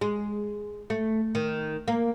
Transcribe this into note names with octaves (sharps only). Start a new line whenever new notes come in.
G#3
A3
D#3
A#3